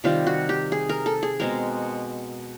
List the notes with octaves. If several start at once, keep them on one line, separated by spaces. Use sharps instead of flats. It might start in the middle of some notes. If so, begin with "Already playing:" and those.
C3 D#3 G3 F4
F#4
G4
G#4
A#4
A4
G#4
B2 G#3 C4 A#4